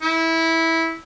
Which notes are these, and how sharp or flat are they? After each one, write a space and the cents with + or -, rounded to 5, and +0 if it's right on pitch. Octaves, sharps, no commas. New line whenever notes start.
E4 -15